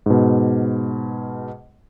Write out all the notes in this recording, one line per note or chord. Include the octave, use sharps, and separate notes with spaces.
G#2 B2